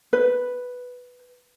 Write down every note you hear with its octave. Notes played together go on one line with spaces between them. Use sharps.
B4